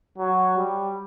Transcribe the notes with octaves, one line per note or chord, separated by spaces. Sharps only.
F#3
G3